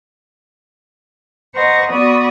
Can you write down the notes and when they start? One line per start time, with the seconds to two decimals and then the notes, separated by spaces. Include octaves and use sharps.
1.55 B4 C5 D#5 F#5 A#5 C#6
1.90 B3 F#4 D5 B5 C#6 D#6